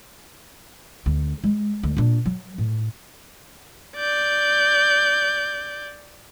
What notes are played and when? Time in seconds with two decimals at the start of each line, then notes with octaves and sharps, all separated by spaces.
1.06 D2
1.44 G#3
1.83 D2
1.97 A#2 D4
2.26 F#3
2.58 A2
3.97 D5 G6